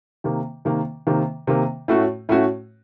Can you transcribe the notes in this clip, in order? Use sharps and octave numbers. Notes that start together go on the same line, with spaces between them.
C3 D#3 A#3
C3 D#3 A#3
C3 D#3 A#3
C3 D#3 A#3
A2 A3 C#4 F#4
A2 A3 C#4 F#4